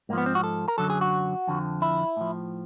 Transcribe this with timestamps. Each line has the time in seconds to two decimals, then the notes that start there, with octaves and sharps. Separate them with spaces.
0.09 G#2 A#3
0.13 F3 B3
0.26 C4
0.35 F#4
0.44 A4
0.68 A#4
0.78 F#2 D3 F#3 A4
0.90 G#4
1.01 F#4
1.47 F2 D3 F3
1.82 E4
2.17 A2 F3